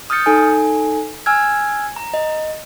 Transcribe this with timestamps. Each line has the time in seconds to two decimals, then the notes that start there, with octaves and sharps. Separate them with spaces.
0.10 D#6 F6 G6 A6 C#7
0.26 D#4 A4 G#5
1.26 G#5 E6 F6 G#6
1.96 A#5
2.14 D#5